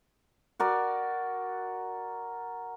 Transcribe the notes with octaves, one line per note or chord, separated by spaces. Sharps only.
F#4 A#4 D5